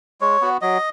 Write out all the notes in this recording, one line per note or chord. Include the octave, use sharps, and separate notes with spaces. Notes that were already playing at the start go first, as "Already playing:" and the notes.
G#3 C#5
B3 F#4
F#3 D#5